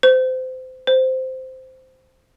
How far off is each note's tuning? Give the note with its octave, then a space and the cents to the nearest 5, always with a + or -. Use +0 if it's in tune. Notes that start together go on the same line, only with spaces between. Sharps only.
C5 -25
C5 -10